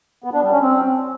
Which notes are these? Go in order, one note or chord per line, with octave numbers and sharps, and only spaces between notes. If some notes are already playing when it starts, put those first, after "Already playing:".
B3
D4
G3
C#4
C4